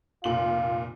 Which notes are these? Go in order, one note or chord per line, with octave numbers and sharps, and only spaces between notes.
F1 A#2 F4 F#7